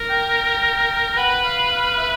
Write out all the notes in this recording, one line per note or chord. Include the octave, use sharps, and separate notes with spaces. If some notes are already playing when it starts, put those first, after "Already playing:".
Already playing: A#4
G5
B4 F#5
F5
F5
E5